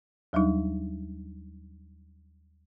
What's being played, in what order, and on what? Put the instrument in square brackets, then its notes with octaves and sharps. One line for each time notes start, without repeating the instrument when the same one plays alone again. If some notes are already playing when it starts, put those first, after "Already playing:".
[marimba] D#2 F#3 G3 D4 D#4